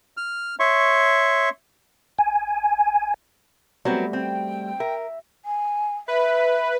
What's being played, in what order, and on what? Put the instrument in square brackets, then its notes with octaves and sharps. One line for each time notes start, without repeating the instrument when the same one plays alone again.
[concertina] F6
C#5 E5 C6 C#6
[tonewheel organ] G#5
[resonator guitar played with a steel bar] F#3 B3 C4 [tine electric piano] G3 A3
[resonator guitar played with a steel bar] C4 [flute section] G5
[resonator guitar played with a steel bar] A#4 [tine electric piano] E5
[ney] G#5
[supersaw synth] B4 [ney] E5